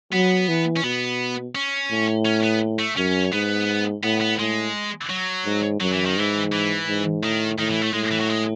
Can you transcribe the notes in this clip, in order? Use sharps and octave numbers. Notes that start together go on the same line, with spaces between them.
F#3 B3
E3
C#4
B2 B3
C#4
A2
C#4
B3
A3
F#2 C#4
G#2 B3
A2 B3
B3
A2 G#3
F#3
G#2
F#2 F#3
E3
D#3
G#2 E3
E3
G#2
A2 D#3
A2 D#3
E3
A3
A2 G#3
E3
F#3
G#3